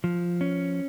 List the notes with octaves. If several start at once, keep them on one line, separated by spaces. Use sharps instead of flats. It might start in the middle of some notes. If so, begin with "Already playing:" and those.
F3
C#4